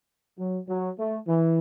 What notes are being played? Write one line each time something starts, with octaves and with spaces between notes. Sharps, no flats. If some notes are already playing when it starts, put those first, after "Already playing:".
F#3
F#3
A3
E3